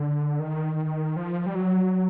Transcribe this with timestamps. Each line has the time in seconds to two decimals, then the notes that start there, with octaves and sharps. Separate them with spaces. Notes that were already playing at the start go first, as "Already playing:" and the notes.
Already playing: D3
0.40 D#3
1.16 F3
1.46 G3
1.55 F#3